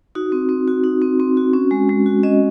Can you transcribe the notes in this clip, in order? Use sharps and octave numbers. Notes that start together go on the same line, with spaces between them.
D#4 F#4
C4
C4
F#4
D#4
C4
C4
F#4
C#4
G#3
G#3
F#4
C#4 D#5